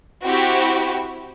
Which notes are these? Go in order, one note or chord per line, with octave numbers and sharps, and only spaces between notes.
C4 E4 F#4 G4